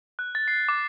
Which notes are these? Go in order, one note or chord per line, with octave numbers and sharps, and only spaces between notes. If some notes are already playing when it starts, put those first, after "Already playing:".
F#6
A6
C7
D6